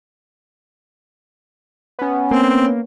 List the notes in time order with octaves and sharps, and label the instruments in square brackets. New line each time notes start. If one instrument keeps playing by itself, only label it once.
[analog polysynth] B3 C#4
[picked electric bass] A#3 [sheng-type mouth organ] C4